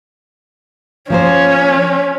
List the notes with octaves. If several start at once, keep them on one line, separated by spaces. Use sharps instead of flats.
F3 A#3 C#4 C5